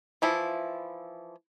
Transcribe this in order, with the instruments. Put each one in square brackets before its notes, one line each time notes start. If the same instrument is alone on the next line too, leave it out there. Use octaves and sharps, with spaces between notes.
[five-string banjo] E3 F3 E4